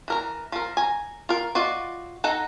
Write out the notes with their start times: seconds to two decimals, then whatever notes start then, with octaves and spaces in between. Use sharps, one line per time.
0.08 E3 A#4 A#5
0.52 F3 A#4
0.77 G#5 A#5
1.29 F4 A#4
1.55 F4 F#4 D5 D#5
2.24 D#4 A4 F#5 A#5